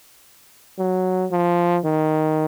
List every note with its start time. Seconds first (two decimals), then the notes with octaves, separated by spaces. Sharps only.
0.79 F#3
1.31 F3
1.85 D#3